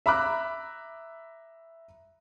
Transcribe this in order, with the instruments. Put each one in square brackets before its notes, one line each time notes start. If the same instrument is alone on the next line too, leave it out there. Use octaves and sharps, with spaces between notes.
[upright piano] E5 A#5 B5 D6 F#6